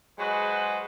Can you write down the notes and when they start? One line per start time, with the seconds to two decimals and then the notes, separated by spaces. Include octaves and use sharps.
0.19 F#3 G#3 F#4 B4 C5